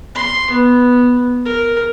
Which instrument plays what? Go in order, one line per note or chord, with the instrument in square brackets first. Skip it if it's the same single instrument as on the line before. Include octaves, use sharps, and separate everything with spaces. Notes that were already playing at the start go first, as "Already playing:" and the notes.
[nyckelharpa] C6
B3
A#4